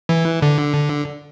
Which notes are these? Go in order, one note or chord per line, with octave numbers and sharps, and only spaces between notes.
E3
D3